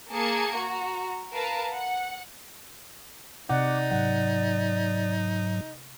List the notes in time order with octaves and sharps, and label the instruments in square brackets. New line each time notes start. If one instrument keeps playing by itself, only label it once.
[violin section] A#3 G#4 A#4 A5 G#6 C#7
F#4 A#5
A#4 B4 F5 A5 A#5
F#5
[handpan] C3 F#5 [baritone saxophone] D#4 [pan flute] D5 [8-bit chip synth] D6
[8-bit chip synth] G#2 F#3 [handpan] F#5